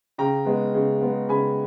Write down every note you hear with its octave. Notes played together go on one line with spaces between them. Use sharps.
C#3 G5 A#5
G#3 B3
C#3
G#3 B3
C#3 G#5 B5